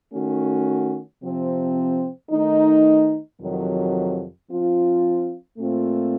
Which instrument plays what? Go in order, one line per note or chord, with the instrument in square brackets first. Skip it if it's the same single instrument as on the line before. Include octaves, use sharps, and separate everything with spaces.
[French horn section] D#3 A3 C#4 F#4
C3 F3 C4
D#3 A3 D#4
F2 C3 D#3 F#3
F3 C4 F4
A#2 A3 C4 F4